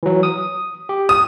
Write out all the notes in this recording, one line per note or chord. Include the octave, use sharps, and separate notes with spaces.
E3 F#3
D#6
G4
D#6